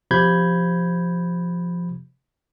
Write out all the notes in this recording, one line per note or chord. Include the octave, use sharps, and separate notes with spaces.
C3 F3 B5 G6 G#6